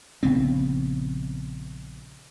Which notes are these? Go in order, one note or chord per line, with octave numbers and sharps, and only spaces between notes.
A#1 C#3 B3 C4